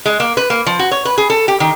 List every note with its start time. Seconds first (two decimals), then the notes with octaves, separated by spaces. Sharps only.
0.06 G#3
0.20 A#3
0.37 B4
0.50 A#3
0.66 F3
0.79 F#4
0.91 C#5
1.05 B4
1.18 G#4
1.30 A4
1.48 G4
1.60 D#3